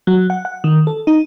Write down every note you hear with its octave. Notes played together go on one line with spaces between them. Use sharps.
F#3
F#5
F#5
D#3
A4
D#4